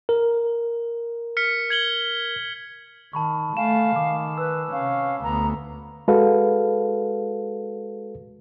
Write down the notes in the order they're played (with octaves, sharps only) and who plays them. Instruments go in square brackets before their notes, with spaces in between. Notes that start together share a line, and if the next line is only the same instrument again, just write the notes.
[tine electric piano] A#4
[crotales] F6 B6 C#7
G#6 F#7 G7
[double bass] D#3 [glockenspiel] A5 B5 C#6
[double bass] A3 [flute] F5 [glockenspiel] G#5 E7
[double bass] D#3 [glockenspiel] D6
[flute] B4 [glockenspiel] E6
[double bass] C3 C#4 [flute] F5
[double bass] D2 B3 [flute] A#5
[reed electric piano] G#3 F#4 A4 B4 F5